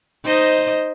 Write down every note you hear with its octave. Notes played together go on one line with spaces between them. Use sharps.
D#4 C5 D#5